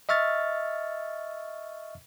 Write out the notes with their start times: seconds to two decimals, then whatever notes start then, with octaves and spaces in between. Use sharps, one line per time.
0.09 D#5 E5 C#6 F6 A6